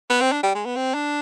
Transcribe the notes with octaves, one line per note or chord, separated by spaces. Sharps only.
B3
C4
D4
G3
G#3
B3
C4
D4